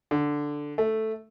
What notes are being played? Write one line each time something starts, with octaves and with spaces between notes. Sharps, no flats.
D3
A3